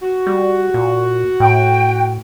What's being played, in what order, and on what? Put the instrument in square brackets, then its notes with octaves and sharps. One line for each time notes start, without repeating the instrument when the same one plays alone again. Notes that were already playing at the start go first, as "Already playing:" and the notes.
[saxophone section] F#4
[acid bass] G3
A#2
[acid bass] A2 [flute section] G5